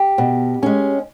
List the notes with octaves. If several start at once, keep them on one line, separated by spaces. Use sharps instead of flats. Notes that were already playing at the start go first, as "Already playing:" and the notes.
Already playing: G4
B2
G#3 C#4